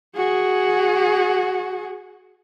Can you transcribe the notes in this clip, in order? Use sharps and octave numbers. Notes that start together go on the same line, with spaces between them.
F#4 G#4